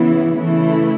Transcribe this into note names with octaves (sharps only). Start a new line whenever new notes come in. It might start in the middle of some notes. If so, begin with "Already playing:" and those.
Already playing: C#3 E3 B3 E4
C#3 E3 A3 E4